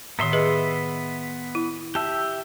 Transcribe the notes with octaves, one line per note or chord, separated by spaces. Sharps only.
A2 D#3 B3 E5 C6
G#4 B4 D#5
E4
G4 E5 A5